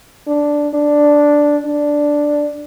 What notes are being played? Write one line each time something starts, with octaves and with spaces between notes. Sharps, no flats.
D4
D4
D4